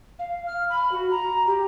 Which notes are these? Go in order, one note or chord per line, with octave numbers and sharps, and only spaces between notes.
F5
F6
B5
F#4
A#5
G4